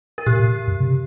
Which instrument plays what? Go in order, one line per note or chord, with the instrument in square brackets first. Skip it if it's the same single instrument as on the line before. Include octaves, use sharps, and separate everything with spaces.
[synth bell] A#4
[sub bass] A#2 [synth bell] G4
[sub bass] A#2
G2
C3